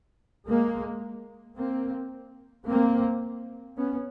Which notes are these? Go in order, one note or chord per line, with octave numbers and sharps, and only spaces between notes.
G#3 A#3
A#3 C4
A#3 C4
B3 C#4